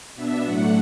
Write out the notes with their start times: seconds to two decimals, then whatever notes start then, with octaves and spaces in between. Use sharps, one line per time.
0.15 B2 B3 D4 E5
0.44 A2 F#3 A3 D4 F#5